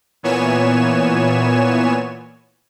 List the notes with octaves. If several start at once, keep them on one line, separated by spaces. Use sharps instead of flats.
A#2 E3 B3 C#5 G#5 E7